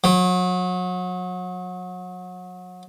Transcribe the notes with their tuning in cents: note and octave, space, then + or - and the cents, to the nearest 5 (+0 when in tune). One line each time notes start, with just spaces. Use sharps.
F#3 -30